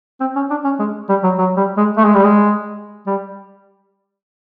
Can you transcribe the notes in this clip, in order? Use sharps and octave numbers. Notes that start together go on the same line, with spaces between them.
C4
C#4
D4
C#4
G#3
G3
F#3
F#3
G3
G#3
A3
G#3
G3
G#3
G3